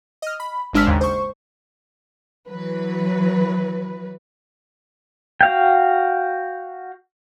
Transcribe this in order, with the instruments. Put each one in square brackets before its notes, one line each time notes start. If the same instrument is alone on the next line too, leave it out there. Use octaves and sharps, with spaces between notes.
[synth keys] D#5 F6
B5
G#1 G#3 D4 E6 F6 B6
D#2 G#2 C#3
C5 C#6
[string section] E3 F#3 B4
[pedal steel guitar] F#4 F5 G5